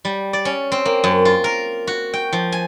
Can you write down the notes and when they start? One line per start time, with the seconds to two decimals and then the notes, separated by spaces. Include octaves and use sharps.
0.05 G3
0.33 D5
0.45 C#4
0.72 C4
0.85 A#3
1.04 F#2
1.25 F4
1.44 A#4
1.87 F#4
2.14 G5
2.33 F3
2.52 G#5